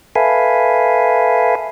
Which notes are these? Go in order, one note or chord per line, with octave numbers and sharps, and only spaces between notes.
A4 B4 E5 F5 G#5